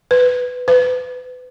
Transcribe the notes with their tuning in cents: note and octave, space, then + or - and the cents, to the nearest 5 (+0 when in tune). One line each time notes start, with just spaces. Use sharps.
B4 +10
B4 +30